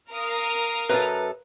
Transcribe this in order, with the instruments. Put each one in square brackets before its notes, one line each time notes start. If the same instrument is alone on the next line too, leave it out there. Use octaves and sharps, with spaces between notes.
[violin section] A#4 F5 D#6
[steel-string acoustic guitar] F#2 A4 [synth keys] B4 A#5